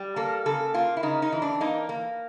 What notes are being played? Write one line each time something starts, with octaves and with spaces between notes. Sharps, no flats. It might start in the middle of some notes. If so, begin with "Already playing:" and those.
Already playing: G3
A#3 A4
C#3 A4
A#3 F4
E4
C#3 D#4
D#4
E3
D4
A#3 D#4
A#3